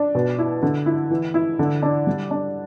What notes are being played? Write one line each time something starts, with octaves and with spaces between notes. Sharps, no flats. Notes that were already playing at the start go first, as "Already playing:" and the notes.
Already playing: D4
B2
E4
D3
E4
E3
E4
D3
D4
G3
D4